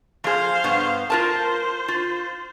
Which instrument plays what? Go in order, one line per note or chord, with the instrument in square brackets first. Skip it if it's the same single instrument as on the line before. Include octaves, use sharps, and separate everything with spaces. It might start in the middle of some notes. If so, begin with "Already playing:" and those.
[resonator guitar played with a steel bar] F3 G#4 [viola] C5 F5
[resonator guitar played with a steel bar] G2 B3
[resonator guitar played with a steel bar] F4 A#4 A5 [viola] C5
[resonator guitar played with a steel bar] F4